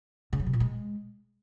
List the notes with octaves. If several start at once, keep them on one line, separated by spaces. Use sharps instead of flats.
C#3
F#3
C3
A#2
G#3